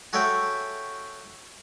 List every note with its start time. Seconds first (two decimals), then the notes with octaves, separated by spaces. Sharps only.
0.13 F#4 G#4 A4 C#5 E5 G5